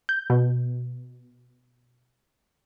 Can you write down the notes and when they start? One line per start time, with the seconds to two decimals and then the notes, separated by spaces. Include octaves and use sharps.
0.09 G6
0.30 B2